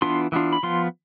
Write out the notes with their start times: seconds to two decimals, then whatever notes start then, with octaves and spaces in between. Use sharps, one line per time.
0.02 E3 B3 D4 F4 C6
0.32 E3 B3 D4 F4
0.53 B5
0.63 F3 B3 F4 C6